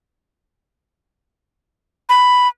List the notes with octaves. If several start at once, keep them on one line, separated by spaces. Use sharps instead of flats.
B5